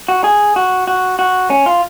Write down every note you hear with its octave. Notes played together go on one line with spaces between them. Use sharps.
F#4
G#4
F#4
F#4
F#4
C#4
F4